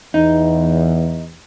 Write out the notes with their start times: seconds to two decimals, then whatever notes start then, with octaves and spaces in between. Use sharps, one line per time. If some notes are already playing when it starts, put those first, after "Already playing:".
0.14 E2 D#4